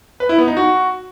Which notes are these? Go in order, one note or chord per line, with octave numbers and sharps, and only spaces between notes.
B4
E4
B3
D#4
F#4